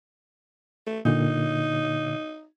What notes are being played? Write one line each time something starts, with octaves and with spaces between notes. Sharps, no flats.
A3
A#2 D3 D#4